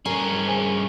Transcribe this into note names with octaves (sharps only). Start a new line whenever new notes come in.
G2 C#4 G#4 A#4
C5 G#5